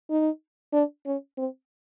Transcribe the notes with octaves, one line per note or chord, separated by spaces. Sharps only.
D#4
D4
C#4
C4